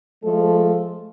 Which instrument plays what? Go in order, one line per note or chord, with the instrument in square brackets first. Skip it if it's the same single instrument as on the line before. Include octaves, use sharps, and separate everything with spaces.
[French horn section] F3 G#3 A3 A4